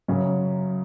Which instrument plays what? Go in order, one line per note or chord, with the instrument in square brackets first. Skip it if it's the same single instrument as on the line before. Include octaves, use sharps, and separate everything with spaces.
[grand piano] F#2 C#3 F#3 C#4